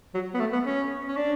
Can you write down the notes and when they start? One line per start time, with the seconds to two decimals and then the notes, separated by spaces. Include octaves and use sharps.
0.15 F#3
0.34 B3
0.40 A3
0.53 B3
0.66 C#4
1.08 C#4
1.17 D4